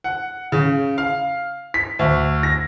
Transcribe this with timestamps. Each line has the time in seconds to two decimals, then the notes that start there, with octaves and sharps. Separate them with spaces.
0.04 F#5
0.52 C#3
0.98 F5
1.74 B6
1.99 D2
2.43 A#6